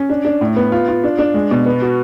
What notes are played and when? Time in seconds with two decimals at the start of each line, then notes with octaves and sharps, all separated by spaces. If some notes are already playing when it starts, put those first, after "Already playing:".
Already playing: C#4
0.09 D4
0.25 D4
0.41 A2
0.56 B3
0.72 F4
0.88 F4
1.04 D4
1.19 D4
1.34 G#3
1.51 B2
1.66 B3
1.82 F#4